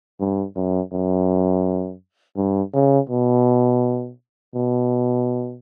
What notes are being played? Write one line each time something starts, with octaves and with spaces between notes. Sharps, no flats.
G2
F#2
F#2
G2
C#3
B2
B2